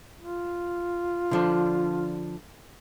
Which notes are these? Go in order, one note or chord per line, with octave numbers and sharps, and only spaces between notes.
F4
D3 F3 D4